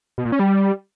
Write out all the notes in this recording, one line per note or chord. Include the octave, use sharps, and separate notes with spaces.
B2
A#2
C#4
G3